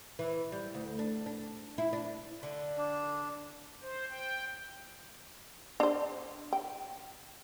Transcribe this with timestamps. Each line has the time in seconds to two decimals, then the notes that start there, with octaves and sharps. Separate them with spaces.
0.19 E3
0.52 G3
0.75 D2
0.99 D4
1.26 D4
1.78 E4
1.93 D4
2.43 D3
2.78 D4
3.81 C5
4.10 G5
5.80 D4 C5
6.53 G5